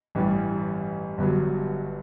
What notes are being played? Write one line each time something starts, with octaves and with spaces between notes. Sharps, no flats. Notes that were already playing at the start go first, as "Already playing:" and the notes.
A1 G2 E3 G3
G1 G2 F#3